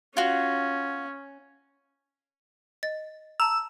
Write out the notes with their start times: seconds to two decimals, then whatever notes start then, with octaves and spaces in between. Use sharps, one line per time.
0.17 C#4 F4 F#4
2.83 D#5 A6
3.40 A5 A#5 E6